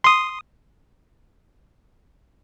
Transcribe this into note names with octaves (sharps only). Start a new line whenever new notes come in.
C6 D#6